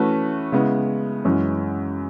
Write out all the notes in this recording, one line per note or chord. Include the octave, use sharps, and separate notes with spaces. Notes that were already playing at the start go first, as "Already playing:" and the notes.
Already playing: E3 A3 C#4 F#4 B4
C#3 G#3 B3 E4
F#2 E3 G#3 C#4